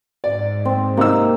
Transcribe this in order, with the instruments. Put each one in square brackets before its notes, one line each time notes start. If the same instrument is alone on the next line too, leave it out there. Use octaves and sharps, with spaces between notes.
[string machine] G#2 [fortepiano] D5
[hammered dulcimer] C4
[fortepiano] C3 D#4 E6 [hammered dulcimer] A#3